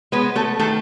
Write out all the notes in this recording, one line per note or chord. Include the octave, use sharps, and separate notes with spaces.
G#3 B3 B4
A3 A4
D#3 A3 A4